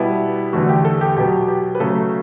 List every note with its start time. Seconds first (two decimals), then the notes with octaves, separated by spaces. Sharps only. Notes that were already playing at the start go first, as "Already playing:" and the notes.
Already playing: B2 G3 B3 E4
0.53 E2 D3 A3 F#4
0.69 G4
0.85 A4
1.01 G4
1.16 B2 F#3 B3 G4
1.48 G4
1.75 B4
1.80 C#3 F#3 A3 A4